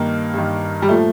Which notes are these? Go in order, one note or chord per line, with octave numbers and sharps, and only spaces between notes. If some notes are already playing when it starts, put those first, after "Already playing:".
Already playing: G2 D#3 A#3
G2 D#3
G3
A#2 F3 A3